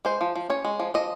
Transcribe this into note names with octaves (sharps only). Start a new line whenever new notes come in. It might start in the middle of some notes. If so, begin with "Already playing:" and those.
G#3 C5
F3
F3
C#4 C#5
G#3
F3
F3 D#5